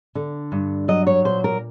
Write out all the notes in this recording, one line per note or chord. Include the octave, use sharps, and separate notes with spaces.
D3
G2
F#3 D#5
C#5
A#2 C5
A#4